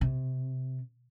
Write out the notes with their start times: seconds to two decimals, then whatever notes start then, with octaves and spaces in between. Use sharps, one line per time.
0.01 C3